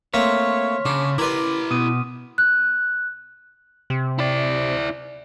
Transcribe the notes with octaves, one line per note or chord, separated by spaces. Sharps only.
A3 A#3 C4 C#5 C6 F6 B6
C#3 D4
E4 A#4 B4 D5 C6 D6
B2 D#6 D#7
F#6
C3
E4 D5